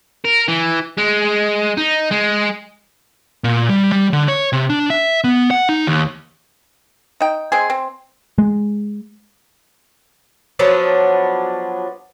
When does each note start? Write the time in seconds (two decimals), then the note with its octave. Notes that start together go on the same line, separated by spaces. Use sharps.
0.25 A#4
0.48 E3
0.97 G#3
1.78 D#4
2.12 G#3
3.44 A#2
3.69 G3
3.92 G3
4.13 D3
4.28 C#5
4.53 C3
4.70 D4
4.90 E5
5.24 B3
5.51 F#5
5.69 D#4
5.87 D#2
7.21 D#4 G5
7.52 G#3 C4 G#4
7.70 C4
8.38 G#3
10.59 F3 F#3 B3 D4